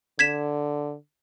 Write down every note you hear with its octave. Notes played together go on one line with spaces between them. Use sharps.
D3 G#6 B6 E7